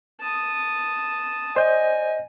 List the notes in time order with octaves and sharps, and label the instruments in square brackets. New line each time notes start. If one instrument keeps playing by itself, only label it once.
[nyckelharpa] A5 D#6
[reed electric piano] C5 D5 G6 [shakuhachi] D#5 [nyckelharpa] G#5